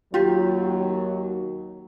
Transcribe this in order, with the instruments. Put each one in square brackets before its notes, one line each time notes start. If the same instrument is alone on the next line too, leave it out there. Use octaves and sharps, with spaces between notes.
[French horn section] D#2 F#3 [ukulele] F4 G4